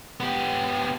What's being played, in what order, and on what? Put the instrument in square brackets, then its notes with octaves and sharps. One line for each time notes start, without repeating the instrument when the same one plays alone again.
[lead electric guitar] B3 G4